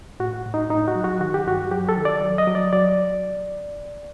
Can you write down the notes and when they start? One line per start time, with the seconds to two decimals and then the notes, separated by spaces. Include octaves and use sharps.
0.20 A2 F#4
0.46 A2
0.54 D#4
0.70 A2 D#4
0.88 F#4
0.96 F#3
1.04 F#4
1.21 D#3 F#4
1.34 G4
1.46 G2 F#4
1.71 F#3 G4
1.89 A4
1.97 D#3
2.05 D5
2.21 F#3
2.38 D#5
2.47 F#3
2.55 D5
2.73 F#3 D5